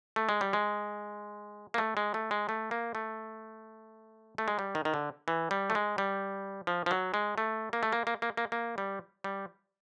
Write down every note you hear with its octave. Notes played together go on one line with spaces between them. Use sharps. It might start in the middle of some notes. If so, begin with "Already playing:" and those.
A3
G#3
G3
G#3
A#3
A3
G#3
A3
G#3
A3
A#3
A3
A3
G#3
G3
D#3
D#3
D3
E3
G3
A3
G#3
G3
F3
F3
F#3
G#3
A3
A#3
A3
A#3
A#3
A#3
A#3
A#3
G3
G3